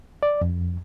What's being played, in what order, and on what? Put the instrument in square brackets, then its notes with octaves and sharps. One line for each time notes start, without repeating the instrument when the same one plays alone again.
[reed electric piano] D5
F2